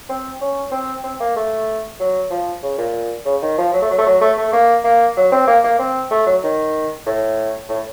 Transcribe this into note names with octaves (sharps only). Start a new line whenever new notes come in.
C4
C#4
C4
C4
A#3
A3
F#3
F3
C#3
A#2
C#3
D#3
F3
F#3
A3
F#3
A3
F#3
A3
A3
A#3
A#3
F#3
C4
A#3
A#3
C4
A3
F#3
D#3
A2
A2